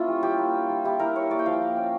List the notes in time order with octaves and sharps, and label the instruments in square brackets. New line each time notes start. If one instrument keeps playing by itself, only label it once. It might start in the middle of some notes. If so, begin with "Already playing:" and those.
Already playing: [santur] A#3 C#4 E4 F4
G3
G3 G4
A#3
D4
G3
E4 G4
E4 A#4
A#3 C#5
A#3 D5
G5
F3 F5
A#3
C#4